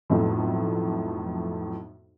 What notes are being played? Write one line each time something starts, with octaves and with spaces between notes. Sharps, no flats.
B1 F2 A2